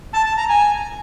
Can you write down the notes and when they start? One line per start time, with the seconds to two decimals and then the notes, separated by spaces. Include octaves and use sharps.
0.13 A5
0.25 A5
0.37 A#5
0.48 G#5